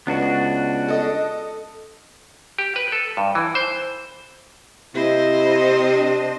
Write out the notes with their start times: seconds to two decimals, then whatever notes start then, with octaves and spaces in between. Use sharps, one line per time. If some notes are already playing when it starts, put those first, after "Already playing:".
0.07 C#2 B3 D4 F#4
0.88 A4 D#5
2.58 G4
2.76 B4
2.92 A4
3.17 G2
3.35 E3
3.55 C5
4.95 C3 E4 C5 D#5
5.90 D4